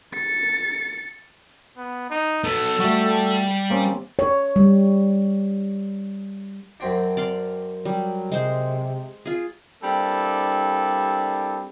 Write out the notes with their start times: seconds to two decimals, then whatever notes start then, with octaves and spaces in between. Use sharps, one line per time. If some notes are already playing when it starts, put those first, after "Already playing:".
0.14 A6 C#7
1.77 B3
2.10 D#4
2.44 F#3 B3 A4
2.80 G3 A3 F#4
3.70 A#3 C4 C#4 G4
4.19 C#5
4.56 G3
6.80 F#2 C4 D4
7.17 D5 F5 C6
7.85 F#3 G3
8.32 C3 G#3 C5
9.25 F4 G#4
9.83 G3 A#3 C4 D4 E4 A4